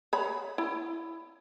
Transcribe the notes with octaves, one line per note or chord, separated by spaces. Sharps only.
C#5 B5
E4